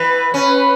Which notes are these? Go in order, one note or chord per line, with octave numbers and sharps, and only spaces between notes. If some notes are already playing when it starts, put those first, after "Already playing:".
Already playing: E3 B4
C#4 B4